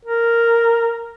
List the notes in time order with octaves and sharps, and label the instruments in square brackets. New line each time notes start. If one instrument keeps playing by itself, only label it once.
[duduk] A#4